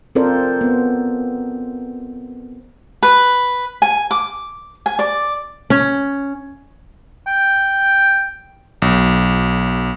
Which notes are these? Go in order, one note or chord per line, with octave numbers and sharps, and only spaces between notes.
C4 F4 A4 A#4 C5 D5
B3
B4
G#5
D6
G#5
D5
C#4
G5
B1